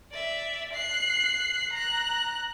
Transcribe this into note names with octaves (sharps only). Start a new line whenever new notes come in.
D5 E5
F#6 C7
A#5 F#6